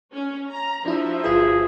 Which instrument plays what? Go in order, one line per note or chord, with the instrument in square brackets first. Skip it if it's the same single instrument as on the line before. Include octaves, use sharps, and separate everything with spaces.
[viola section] C#4 C#5
A#5
[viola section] F3 F#4 E5 [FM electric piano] D4 E4 A#5
[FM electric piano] G1 F4 B4 [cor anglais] G#4